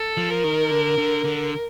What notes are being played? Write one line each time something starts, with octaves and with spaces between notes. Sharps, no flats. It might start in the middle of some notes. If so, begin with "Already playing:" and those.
Already playing: A4
F3
A#4
D#3
D3
D3
D3